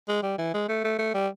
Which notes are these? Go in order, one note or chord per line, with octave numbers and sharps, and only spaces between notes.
G#3
G3
E3
G#3
A3
A3
A3
G3